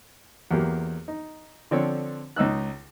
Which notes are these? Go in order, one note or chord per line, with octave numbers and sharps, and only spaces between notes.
E2 F#3 A#3 G4
D#4
D3 F3 C4 D4 A4 C#5
C#2 D#4 E6 F#6